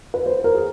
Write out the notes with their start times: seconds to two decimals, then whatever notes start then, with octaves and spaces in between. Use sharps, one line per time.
0.14 B4
0.26 C5
0.44 A#4
0.55 G#4